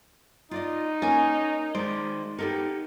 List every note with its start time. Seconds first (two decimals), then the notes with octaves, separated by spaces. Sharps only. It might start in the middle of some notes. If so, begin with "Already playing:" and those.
0.51 D#4 F4 D5 D#5
1.02 A#3 C#4 G#5
1.75 D#3 G#3 C5 D5
2.39 B3 D#4 G4 A4 A#4